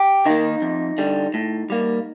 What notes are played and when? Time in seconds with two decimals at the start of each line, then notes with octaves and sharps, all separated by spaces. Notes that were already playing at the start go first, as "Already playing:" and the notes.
Already playing: G4
0.26 D#3 A#3 D#4
0.62 F2
0.98 D3 G3
1.34 A2
1.70 G3 A#3